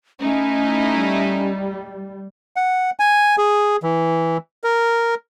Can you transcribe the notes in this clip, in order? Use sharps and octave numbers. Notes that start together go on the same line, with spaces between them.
A3 C#4 D#4 E4
G3
F#5
G#5
G#4
E3
A#4